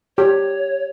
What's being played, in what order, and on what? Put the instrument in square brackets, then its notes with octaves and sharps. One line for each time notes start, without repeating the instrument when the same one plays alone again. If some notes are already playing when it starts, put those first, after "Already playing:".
[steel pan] G4 [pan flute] C#5